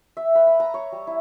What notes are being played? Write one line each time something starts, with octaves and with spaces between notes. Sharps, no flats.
E5
B4
B5
A#5
C#5
G3
E4